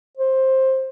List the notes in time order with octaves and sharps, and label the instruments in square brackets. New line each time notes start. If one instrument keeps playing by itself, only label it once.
[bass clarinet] C5